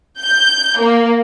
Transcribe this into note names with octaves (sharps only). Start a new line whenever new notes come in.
G6
A#3